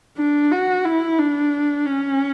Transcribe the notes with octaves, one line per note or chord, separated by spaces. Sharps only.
D4
F#4
E4
D4
C#4